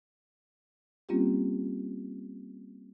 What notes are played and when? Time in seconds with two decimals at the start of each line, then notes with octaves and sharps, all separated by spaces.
1.09 G3 A#3 C4 C#4 F4 G4